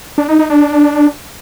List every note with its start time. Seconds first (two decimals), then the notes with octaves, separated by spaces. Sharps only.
0.18 D4
0.28 D#4
0.39 D#4
0.50 D4